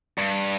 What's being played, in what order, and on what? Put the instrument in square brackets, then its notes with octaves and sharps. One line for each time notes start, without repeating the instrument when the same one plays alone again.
[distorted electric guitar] G2